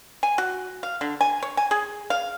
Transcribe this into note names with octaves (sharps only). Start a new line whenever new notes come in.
G#5
F#4
F5
D3
G#5
C#5
G#5
G#4
F5